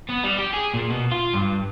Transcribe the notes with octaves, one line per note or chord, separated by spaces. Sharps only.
B3
G3
G4
G#4
A#2
B2
F4
G2